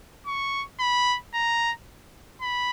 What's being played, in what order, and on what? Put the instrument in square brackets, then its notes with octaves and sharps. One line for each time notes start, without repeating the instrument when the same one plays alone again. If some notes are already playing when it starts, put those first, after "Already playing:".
[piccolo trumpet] C#6
B5
A#5
B5